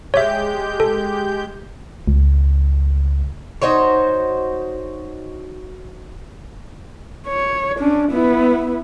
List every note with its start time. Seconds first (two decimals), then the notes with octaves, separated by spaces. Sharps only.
0.14 G#3 G4 C#5 E5 G6
0.80 A4
2.08 C#2
3.62 D#4 F#4 C5 C#5
7.28 C#5
7.78 C#4 D4
8.11 B3 E4